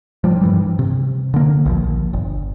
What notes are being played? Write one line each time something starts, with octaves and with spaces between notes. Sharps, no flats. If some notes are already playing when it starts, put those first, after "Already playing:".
F3 G3
G2 E3 G3
C3
D3 A#3
A#1 D#2 F3
G1